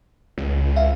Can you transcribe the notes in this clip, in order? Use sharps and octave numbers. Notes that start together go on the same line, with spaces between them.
C#2
E5 F5